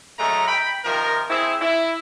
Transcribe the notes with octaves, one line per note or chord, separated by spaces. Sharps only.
F#2 G#3 A3 C#4 A4 A#5
G5 B5
C3 D#3 F3 A#4
C4 E4 G#4
E4